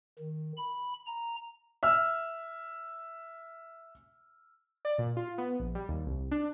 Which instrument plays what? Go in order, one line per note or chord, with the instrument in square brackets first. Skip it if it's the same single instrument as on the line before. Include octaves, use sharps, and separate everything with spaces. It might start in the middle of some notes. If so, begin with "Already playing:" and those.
[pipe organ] D#3
B5
A#5
[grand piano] E5 E6 F6
[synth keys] D5
A#2
F4
B3
A#1
G3
D#2
C2
D4